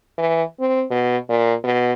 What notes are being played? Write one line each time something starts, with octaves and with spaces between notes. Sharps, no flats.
E3
C4
B2
A#2
B2